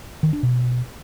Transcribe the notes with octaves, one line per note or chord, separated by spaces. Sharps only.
D#3
D4
B2